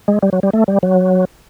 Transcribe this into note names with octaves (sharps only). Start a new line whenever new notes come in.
G#3
G3
F#3
G3
A3
G3
F#3